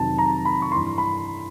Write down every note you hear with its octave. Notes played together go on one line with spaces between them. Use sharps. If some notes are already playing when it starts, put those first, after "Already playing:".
Already playing: F2 C3 D#3 F#3 A5
A#5
B5
C#6
G2 E3 C6
B5